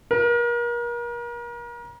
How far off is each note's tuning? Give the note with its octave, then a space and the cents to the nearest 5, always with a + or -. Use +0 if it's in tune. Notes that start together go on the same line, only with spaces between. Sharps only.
A#4 +35